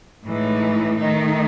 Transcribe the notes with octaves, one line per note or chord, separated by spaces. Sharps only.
A2 E3 G#3 D#4
D#3 A3 D#4